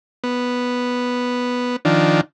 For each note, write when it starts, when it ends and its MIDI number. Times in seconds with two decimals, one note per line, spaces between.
0.24 1.76 59
1.85 2.21 51
1.85 2.21 53
1.85 2.21 62